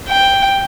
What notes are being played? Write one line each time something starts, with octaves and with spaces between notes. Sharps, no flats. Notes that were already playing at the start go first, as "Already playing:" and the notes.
G5